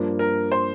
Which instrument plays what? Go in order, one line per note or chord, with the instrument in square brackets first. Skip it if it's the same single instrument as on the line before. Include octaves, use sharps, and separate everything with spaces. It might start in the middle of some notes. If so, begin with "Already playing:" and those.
Already playing: [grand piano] G2 F3 A#3 D4
[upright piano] A#4
C5